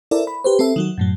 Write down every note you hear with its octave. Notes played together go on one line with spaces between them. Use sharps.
E4 A4 A#4 C5 D5 E5
B5
G4 B4 C5
C4 A4 E5
D#3 F#3 F#4
F#2 A2 F#3